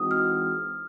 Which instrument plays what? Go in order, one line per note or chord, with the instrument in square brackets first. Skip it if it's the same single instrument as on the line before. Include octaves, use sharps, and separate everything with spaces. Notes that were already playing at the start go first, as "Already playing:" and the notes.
Already playing: [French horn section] E3 G#3 C4 D#4 F#4 [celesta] D#6
[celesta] F6